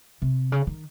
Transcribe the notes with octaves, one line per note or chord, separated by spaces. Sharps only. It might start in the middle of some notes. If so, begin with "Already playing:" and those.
C3
C#3
D#3